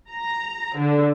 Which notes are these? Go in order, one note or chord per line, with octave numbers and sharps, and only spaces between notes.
A#5
D3